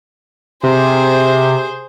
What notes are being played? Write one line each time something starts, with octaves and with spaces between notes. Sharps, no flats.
C3 G#4 C5